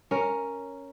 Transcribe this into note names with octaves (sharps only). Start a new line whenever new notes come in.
C#4 A#4